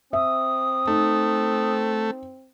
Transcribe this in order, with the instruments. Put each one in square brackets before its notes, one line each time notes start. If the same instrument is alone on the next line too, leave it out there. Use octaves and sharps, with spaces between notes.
[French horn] C4 [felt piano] E5 [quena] D#6
[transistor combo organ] A3 [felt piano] D#4